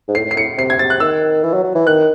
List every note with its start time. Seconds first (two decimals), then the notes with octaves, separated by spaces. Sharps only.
0.08 G#2
0.15 A2 C7
0.26 A2
0.31 C7
0.36 A2 C#7
0.57 C3 C7
0.70 G#6
0.79 C3 A6
0.90 F#6
1.00 D#3 E6
1.43 E3
1.54 F#3
1.64 F#3
1.75 E3
1.87 D#3 F#6